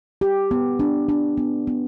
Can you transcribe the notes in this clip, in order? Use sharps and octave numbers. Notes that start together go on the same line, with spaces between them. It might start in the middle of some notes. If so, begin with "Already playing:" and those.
G4
B3
D4
D4
B3
B3